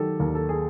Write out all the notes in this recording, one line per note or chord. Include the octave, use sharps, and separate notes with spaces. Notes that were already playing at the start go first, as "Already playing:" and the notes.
Already playing: D#3 F#3 G4 A4
D#2 A#4
A4
G#4